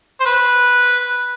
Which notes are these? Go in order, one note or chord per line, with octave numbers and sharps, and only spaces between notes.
C5
B4